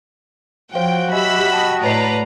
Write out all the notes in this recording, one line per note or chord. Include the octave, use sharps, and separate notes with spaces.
F3 F#4 C5 C#5 F5 G5
F#3 G4 D#5 E5 G#5 B5 E6 B6
D#5 G5 A5 C#6
A2 B4 C#5 D5 A5 A#5 C7